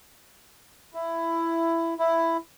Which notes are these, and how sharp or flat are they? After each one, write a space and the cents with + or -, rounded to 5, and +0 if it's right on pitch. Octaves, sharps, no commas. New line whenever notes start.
E4 +10
E4 +5